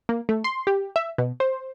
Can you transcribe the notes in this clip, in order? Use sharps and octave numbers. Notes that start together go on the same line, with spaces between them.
A#3
A3
C6
G4
E5
B2
C5